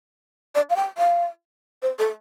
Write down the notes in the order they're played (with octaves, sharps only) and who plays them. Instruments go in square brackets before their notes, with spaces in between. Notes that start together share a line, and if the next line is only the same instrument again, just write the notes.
[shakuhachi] D5
F5
G5
F5
C5
A4